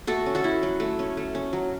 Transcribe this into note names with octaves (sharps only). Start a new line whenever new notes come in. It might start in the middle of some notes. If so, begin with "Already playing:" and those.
A3 F#4 A4
C#4
F#4 A4
E4
F#3
A3
C#4
A3
C#4
F#3